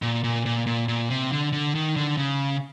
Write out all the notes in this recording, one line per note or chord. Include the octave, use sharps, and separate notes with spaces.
A#2
A#2
A#2
A#2
A#2
C3
D3
D3
D#3
D3
C#3